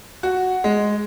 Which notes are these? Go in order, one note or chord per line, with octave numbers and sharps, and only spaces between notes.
F#4
G#3